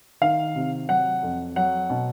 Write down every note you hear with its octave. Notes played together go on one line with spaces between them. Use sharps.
D#3 F5
C3
F#3 F#5
F2
F#3 F#5
B2